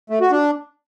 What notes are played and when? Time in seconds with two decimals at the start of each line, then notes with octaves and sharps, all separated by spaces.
0.10 A3
0.21 F#4
0.31 D4